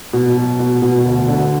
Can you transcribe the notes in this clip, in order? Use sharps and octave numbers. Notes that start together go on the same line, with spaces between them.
B2
F#3
B2
B2
D2
D3